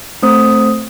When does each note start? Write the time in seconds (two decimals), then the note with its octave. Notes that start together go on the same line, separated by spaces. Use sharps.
0.22 A3 C4 C5 D#6